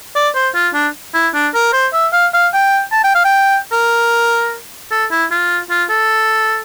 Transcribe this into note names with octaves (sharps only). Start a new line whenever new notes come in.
D5
C5
F4
D4
E4
D4
A#4
C5
E5
F5
F5
G5
A5
G5
F5
G5
A#4
A4
E4
F4
F4
A4